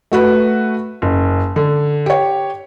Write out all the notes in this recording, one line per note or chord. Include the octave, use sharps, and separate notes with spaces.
A3 F#4 B4
F#1
D3
G4 C#5